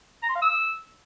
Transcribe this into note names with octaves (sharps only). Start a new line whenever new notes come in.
A#5
C6
F5
E6